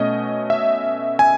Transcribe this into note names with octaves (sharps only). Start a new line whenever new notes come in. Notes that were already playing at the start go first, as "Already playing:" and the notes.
Already playing: B2 A3 C#4 D#5
E5
G#5